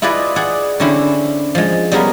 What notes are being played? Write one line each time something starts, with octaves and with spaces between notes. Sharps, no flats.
E4 F4 G#4 B4 D5 D#5
G#4 D5 F#5
D3 C4 C#4 E4 C5
F3 G#3
G3 B3 C#4 G#4 A#4 F5